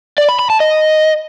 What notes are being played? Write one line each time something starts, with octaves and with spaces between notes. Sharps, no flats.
D5
B5
B5
A5
D#5